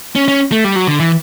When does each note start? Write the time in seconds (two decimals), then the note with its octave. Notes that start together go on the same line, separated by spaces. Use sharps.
0.16 C#4
0.28 C#4
0.52 A3
0.64 G3
0.76 F#3
0.87 D3
1.00 E3